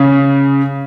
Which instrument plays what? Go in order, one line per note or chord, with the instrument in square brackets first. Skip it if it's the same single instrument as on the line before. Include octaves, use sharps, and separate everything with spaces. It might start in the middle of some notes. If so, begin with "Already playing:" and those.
Already playing: [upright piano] C#3